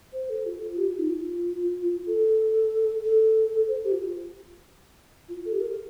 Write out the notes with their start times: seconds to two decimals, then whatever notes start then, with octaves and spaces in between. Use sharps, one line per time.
0.13 C5
0.30 A4
0.46 F4
0.78 G4
0.89 F4
0.99 D#4
1.10 F4
2.07 A4
3.03 A4
3.68 C5
3.84 G4
3.92 F4
5.29 F4
5.45 A4
5.53 G4
5.60 A#4